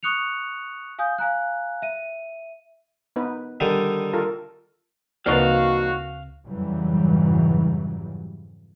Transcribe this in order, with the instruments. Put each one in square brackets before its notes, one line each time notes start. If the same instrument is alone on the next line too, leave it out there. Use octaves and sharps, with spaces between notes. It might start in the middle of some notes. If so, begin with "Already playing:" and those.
[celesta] C#6 D#6 F#6 C#7 F7
F5 G#5 D#6 G6
F5 G#5 A#5 F#6
E5 D#7
[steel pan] B3 D#4 B4
[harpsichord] D3 D#3 G3
[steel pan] F4 A4 A#4
[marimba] D2 C#3 B4 [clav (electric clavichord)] A#2 F3 D#4 [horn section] F#4 [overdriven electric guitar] F5
[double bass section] F2 G#2 C#3 E3 F#3 G3